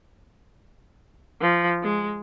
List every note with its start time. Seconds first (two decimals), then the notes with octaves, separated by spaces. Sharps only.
1.41 F3
1.83 G#3